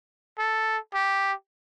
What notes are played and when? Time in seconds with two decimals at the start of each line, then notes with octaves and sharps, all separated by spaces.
0.38 A4
0.94 G4